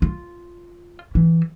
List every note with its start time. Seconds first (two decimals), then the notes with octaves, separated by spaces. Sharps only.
0.02 F4
1.15 E3